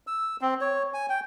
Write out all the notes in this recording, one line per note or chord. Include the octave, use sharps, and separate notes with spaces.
E6
C4
C#5
G#5
G5